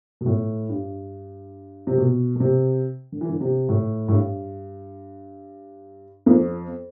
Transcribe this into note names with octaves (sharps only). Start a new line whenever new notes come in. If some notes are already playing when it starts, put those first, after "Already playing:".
B2
A2
G2
C3
B2
B2
C3
D3
E3
D3
C3
A2
A2
G2
F2